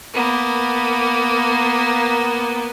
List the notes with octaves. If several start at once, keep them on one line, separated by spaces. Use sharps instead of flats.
A#3 B3